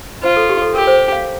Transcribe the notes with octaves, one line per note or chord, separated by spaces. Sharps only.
F4 C5
A4
G4
A4
G4 A#4
C5
F5